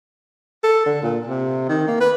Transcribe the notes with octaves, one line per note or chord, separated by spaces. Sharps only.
A4
D3
A#2
C3
D#3
A#3
B4